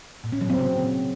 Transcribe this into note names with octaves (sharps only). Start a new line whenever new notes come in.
A#2
C#4
F#3
C4
C#3